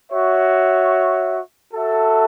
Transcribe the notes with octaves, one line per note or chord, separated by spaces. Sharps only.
F#4 C#5 E5
F#4 A4 E5